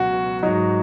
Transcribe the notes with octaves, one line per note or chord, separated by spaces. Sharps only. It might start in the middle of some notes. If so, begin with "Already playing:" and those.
Already playing: C#2 B2 F#3 F#4
G#2 F#3 D#4